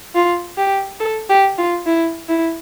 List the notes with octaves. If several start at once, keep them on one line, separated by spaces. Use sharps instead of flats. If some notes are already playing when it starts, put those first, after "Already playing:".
F4
G4
A4
G4
F4
E4
E4